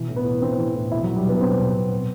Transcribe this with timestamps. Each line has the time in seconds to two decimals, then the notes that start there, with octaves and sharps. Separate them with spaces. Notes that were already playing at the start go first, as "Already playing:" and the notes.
Already playing: B2 E3
0.08 A2
0.16 B3
0.24 A2
0.41 E3 C4
0.58 E3
0.75 A2
0.92 B2 E4
1.04 F#3
1.08 B2
1.16 G3
1.25 B2 B3
1.41 B2 C4
1.59 B2
1.75 B2
1.93 B2